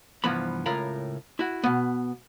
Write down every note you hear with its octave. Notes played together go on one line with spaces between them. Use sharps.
C2 G2 E3 F3 B3 B5
C#2 A2 F4 A#4 F5 B5
E4 F#4
B2 B3